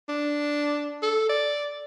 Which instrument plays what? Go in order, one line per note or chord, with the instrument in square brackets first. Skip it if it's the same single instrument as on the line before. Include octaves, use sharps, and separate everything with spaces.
[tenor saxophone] D4
A4
D5